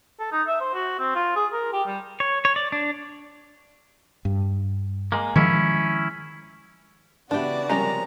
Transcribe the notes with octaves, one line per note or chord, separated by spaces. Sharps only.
A4
D#4
E5
C5
F#4
C4
F4
G#4
A#4
G4
G3
C#5
C#5
D5
D4
G2
G#3 A#3
D#3 F3 G#3 C#4 E4
C#3 E3 B3 D4 E4 F#4 G4 D5
C3 F3 G3 G#3 C#4 A#4 A#5